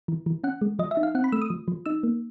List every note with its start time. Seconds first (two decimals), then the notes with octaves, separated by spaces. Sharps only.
0.08 E3
0.26 E3
0.44 C#4 F#5
0.61 G#3
0.79 F3 D#5
0.91 E5
0.97 D#4
1.03 F5
1.15 C4 F#5
1.24 B5
1.32 A3 E6
1.42 D#6
1.50 F3
1.68 F3
1.86 D#4 E6
2.03 A#3